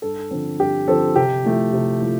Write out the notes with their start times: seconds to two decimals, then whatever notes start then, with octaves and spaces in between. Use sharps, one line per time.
0.02 G2 A4
0.31 D3 F3 C4
0.59 G2 G4
0.88 D3 F3 C4 A4
1.16 C3 G4
1.44 F3 A3 E4
1.73 C3
2.01 F3 A3 E4